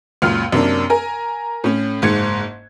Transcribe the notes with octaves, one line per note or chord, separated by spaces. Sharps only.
C#2 F#2 A#2 F6
F#2 C3 A#3 D4
A#4 G#5
A2 C#4
F#1 G#2 G#6 C#7